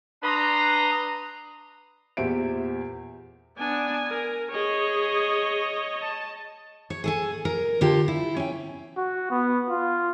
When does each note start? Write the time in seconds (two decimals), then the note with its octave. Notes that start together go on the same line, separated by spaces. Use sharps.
0.23 D4 B4 A#5 C6 D#6
2.17 E2 A#2 G4 C5 E5 D7
3.58 B3 D4 G#5
4.09 A#4
4.51 G#4 C#5 D#5
6.02 A5
6.90 C#5
7.04 G#4 A4 G#5
7.45 A#4
7.81 D3 F4 G4 A#4 A5
8.08 E4
8.37 C#4 G5
8.97 F#4
9.31 B3
9.70 F4